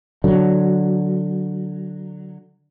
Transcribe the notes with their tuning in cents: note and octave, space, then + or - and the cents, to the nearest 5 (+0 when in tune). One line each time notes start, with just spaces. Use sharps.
D3 +0 F#3 +0